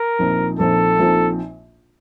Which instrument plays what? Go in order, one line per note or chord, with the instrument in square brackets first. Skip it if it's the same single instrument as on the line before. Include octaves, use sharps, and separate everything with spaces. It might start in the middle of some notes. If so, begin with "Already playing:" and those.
Already playing: [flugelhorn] A#4
[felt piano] A#1 A#2 F3 C4 D#4
[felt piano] A#1 A#2 F3 C4 D#4 [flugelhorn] A4
[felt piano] A#1 A#2 F3 C4 D#4